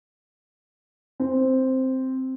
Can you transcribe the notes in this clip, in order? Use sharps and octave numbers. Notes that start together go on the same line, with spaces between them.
C4